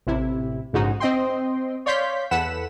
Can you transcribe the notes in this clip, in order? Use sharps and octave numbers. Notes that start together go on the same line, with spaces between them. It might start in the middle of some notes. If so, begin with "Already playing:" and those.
A1 C3 E4
A#1 G#2 C#3 G#3 D#4 F#4
C4 D#5 G5 C6
C#5 D5 F5 C6 G6 B6
E2 A4 B4 F#5 B6 E7